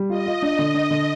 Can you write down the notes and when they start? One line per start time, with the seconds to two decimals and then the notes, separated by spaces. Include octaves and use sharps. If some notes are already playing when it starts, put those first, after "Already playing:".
Already playing: G3
0.10 F4 D#5
0.26 F4
0.42 D4
0.59 D3
0.74 D4
0.91 D3